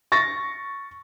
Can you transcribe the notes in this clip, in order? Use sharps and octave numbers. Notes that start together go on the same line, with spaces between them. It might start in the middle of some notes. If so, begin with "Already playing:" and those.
C#6 A6 A#6